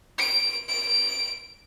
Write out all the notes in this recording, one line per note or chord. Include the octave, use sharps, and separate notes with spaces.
D7
D7